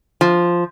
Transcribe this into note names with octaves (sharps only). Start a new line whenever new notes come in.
F3